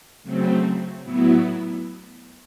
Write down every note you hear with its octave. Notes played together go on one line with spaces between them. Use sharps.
C#3 F#3 A3 C4
A2 F#3 B3 E4